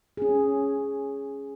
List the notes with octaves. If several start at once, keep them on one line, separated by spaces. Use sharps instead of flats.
C#4 G#4